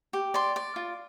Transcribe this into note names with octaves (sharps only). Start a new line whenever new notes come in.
G4
D5 C6
D5
F4